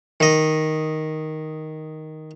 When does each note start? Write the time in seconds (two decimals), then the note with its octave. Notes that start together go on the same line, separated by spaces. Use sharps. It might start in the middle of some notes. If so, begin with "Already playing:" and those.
0.20 D#3 D#5